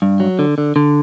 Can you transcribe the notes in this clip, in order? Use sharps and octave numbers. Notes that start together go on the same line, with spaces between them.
G2
F#3
D3
D3
D3